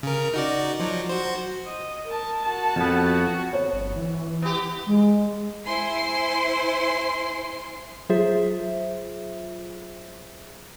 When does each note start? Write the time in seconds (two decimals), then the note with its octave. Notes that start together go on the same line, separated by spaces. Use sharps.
0.03 C#3 A#4
0.34 D#4 F#4 D5
0.80 F3 F#3
1.09 F#4 C5
1.66 D#5
2.08 A#4 A5
2.43 F#4 A5
2.76 F2 B3
3.07 F#4
3.53 C#5
3.73 G1
3.96 E3
4.42 B3 G4
4.87 G#3
5.66 E4 C5 G#5 C6 C7
8.09 F#3 F4 G#4 C5 E5